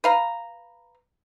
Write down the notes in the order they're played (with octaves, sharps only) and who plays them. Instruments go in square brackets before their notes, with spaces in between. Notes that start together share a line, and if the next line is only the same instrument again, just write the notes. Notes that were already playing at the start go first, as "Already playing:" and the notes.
[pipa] B4 F5 A#5